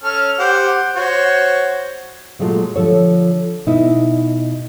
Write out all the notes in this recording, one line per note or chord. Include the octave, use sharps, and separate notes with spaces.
C#4 A4 F6
G4 C5 F#5
F#4 C5 C#5
A#2 F#3 G#3 A3 F4
D3 F3 A4 C#5
B2 D#4 E4